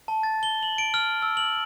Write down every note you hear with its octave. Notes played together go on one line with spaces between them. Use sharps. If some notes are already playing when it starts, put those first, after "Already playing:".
A5
A6
G7
F#7
D7
F6
E6
F#7